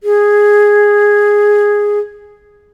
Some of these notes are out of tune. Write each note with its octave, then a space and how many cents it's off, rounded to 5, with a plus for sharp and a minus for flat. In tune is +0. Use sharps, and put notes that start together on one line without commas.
G#4 -5